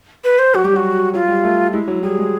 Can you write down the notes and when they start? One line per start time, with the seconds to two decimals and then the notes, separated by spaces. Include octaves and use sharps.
0.24 B4
0.39 C5
0.54 F#3 F#4
0.64 G3 G4
0.73 F#3 F#4
1.14 F#3 F4
1.28 G3
1.44 A3
1.73 G#3 E4
1.88 F#3
2.03 G3 G#4
2.19 G#3